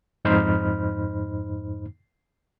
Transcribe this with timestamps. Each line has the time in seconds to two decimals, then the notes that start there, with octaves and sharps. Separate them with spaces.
0.25 F2 G#2 D#4 C5 B5 F6